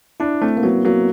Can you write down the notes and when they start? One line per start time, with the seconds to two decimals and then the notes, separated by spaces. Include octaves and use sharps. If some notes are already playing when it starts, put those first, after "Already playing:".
0.20 D4 E4
0.41 A3 C4
0.57 A#3
0.63 F#3 B3
0.85 F#3 A#3